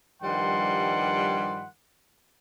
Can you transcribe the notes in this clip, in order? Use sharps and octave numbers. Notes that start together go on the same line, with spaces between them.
G2 D#3 F3 G3 F#5 C6